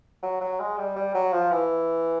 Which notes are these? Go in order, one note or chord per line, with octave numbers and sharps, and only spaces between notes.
F#3
F#3
G#3
G3
G3
F#3
F3
E3